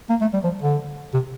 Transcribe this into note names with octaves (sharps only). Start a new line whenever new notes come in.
A#3
A3
G3
F3
D3
C3